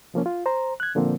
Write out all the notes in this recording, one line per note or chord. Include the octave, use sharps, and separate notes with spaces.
C2 F3 A#3 C#4
F4
C5 A#5
F#6 G#6
A#2 D3 F3 A#3 C4